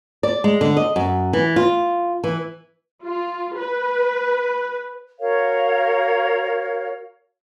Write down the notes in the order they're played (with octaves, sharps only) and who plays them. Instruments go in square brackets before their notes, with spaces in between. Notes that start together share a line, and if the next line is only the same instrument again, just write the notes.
[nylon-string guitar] D5
G#3
D3
D#5
F#2
E3
F4
E3
[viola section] F4
B4
[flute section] F#4 A#4 C#5 F5